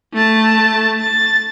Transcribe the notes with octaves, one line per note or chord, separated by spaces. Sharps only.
A3 A5
A6